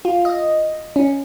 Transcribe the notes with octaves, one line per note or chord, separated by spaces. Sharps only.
F4
D#5
C#4